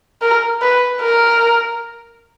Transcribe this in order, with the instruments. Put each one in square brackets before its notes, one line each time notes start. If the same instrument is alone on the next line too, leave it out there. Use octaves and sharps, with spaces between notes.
[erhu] A#4
B4
A#4